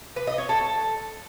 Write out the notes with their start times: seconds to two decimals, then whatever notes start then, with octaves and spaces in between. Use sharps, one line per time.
0.16 B4
0.27 D#5
0.38 C#5
0.49 A4